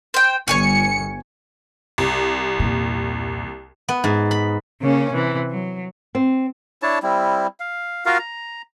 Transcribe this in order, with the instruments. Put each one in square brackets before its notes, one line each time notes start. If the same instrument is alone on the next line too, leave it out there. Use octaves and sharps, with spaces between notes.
[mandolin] C5 G5
[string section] G1 C#7 [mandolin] C#5 G#5 C#6
[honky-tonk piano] C2
[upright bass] E2 A#2
[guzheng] B3
G#2
B5
[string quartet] C#3 A#3 C#4
C3 E3
F#3
[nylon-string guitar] C4
[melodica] D4 E4 C#5 A5
G3 C4 E4
F5
F4 F#4 A#4 F5
A#5